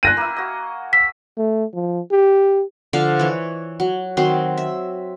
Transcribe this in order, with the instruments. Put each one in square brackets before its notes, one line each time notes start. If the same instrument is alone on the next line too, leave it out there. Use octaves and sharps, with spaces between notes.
[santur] G5 G#5 C6 [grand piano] F#6 A#6 D#7
[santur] A#3 E4
F#4 D#5
[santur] E6 [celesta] B6
[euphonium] A3
F3
G4
[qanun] D3 F3 F5
E3 C#5
F#3
D#3 F#3 C4 C6
E5